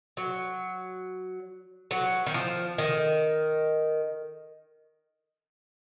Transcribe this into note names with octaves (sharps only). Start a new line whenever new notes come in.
F#3
F#3
D#3
F3
D#3